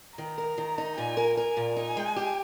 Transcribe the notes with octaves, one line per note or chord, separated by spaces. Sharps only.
D#3 A#5
A#4
D#3
D#4
A#2 G#5
A#4
A#4 G#5
A#2
D#4 G#5
G#3
G4